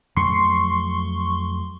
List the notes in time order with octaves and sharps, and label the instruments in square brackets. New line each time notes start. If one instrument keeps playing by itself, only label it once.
[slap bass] F2 F#3 A3 [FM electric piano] C6 C#6